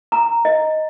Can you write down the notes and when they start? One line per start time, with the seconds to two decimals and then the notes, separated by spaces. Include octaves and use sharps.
0.12 A#5
0.45 D#5